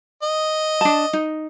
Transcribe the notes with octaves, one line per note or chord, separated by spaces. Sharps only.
D#5
D4 A5
D#4